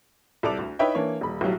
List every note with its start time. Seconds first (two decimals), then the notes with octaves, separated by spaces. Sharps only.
0.43 C2 A4 D5 D6 F7
0.58 D2
0.79 D#4 E4 B4 C#5 E5 G5
0.95 E3 A#3 D4 C#5
1.21 D#1 B5
1.41 B1 A2 F#3 G3